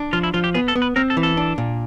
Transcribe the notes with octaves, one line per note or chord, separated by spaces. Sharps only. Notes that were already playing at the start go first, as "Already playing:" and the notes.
Already playing: D4
F3 F4
E4
F3 F4
G4
B3 G#4
A4
B3
B4
C4 A#4
A4
E3
A4
D4
A#2